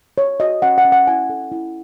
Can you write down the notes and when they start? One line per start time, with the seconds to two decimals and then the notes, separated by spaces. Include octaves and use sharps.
0.18 C#5
0.40 F#4 D#5
0.62 C#4 F#5
0.78 F#5
0.85 C#4
0.92 F#5
1.07 E4 G#5
1.30 A4
1.52 E4